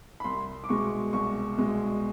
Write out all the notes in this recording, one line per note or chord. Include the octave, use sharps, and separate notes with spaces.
B5
C2 C6
D6
B2 G#3 C#6
C2 C#6
B2 G#3